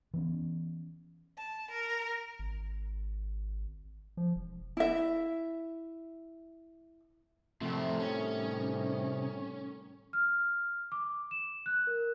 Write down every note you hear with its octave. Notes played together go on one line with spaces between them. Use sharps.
E3 B3 C#4
A5
A#4
G#1
F3
E1
E4 E5
A2 C3 D#3 F3 G3 A3 G4
C#4
F6
D6
E7
F#6
A#4